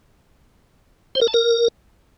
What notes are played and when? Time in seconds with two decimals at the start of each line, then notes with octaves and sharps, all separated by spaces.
1.15 C5
1.21 A#4
1.28 A5
1.34 A#4